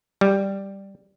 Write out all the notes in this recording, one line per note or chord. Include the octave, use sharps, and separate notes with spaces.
G3